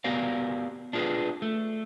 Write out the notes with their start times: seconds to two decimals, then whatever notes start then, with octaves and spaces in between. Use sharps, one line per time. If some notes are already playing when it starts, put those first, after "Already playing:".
0.04 B3 F#4 G4 A#4 D5 F5
0.93 D4 F4 G#4 A#4 B4
1.42 A3